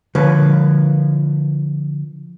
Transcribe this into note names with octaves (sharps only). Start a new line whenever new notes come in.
D3 F3 B4 C#5